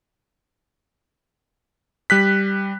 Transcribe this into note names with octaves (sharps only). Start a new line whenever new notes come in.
G3 F#6 B6